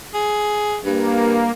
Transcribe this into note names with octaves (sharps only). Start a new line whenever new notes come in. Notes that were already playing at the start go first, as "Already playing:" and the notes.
G#4
G2 A#3